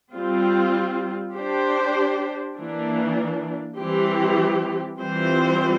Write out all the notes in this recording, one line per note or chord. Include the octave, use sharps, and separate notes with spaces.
G3 C4 F4
D4 G4 C5
E3 A#3 D4
E3 G3 C4 G4
E3 G3 C4 F4 C5